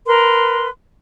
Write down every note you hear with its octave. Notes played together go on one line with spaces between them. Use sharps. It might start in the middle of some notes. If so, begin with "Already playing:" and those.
A#4 B4 C6